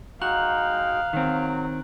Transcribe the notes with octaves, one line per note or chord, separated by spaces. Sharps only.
G#3 D#4 F#4 F5 G5 A#5 F#6 F#7
D#3 F#3 C4